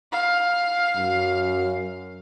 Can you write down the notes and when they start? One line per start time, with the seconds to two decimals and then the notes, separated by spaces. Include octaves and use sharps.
0.12 F5
0.97 F#2